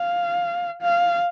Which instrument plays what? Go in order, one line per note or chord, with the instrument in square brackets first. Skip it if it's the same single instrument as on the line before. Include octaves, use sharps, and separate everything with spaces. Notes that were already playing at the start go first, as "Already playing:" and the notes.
Already playing: [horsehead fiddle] F5
F5